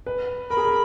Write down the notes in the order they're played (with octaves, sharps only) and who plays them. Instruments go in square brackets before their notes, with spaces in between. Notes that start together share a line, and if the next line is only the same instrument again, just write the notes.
[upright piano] B4
[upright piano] A#4 [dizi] B5
[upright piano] G#4
A#4